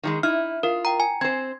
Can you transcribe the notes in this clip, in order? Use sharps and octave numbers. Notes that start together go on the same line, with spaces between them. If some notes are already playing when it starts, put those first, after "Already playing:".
D#3 G3 G#3
D#4 E4 F6
F4 A#4
G5 A#5
G#5
C4 C5 G#6